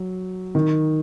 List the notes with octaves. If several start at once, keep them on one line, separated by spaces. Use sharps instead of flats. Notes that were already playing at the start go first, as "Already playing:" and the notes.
Already playing: F#3
D#3